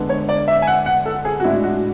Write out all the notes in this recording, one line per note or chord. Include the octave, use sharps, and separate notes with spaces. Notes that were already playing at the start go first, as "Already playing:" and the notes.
Already playing: D3 G#3 B3 D4
C#5
D5
E5
G#5
F#5
F#5
A4
G#4
F#4
A2 G#3 D4 E4
F#4